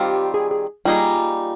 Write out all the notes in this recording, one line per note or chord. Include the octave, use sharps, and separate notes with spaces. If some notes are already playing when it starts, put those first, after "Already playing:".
Already playing: D#3 G3 C4 F4 G4
G#4
G#4
G3 A#3 D#4 F4 G#4